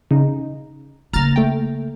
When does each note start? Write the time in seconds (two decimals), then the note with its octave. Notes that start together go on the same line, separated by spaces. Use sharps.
0.11 C#3 D#4
1.13 C#3 A#3 A#5 F6 A6
1.36 A3 G5